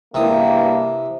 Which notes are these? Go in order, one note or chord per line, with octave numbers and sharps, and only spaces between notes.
E2 G2 C3 A#3 E4 A#5 D#6